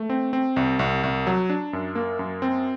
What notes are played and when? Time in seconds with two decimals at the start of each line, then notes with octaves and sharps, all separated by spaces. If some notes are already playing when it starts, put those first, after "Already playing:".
Already playing: A3
0.10 C4
0.33 C4
0.56 C2
0.79 C2
1.03 C2
1.27 F#3
1.50 D4
1.73 F#2
1.95 A#3
2.19 F#2
2.42 C4